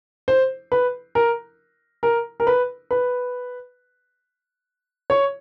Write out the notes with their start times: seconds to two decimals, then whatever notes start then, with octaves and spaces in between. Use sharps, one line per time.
0.28 C5
0.72 B4
1.15 A#4
2.03 A#4
2.40 A#4
2.47 B4
2.91 B4
5.10 C#5